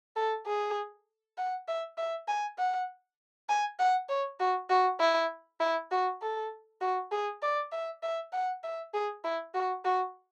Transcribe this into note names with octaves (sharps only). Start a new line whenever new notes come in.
A4
G#4
F#5
E5
E5
G#5
F#5
G#5
F#5
C#5
F#4
F#4
E4
E4
F#4
A4
F#4
G#4
D5
E5
E5
F#5
E5
G#4
E4
F#4
F#4